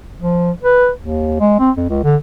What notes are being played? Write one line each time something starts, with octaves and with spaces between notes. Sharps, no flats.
F3
B4
D#2
G#3
C4
F2
C#2
D3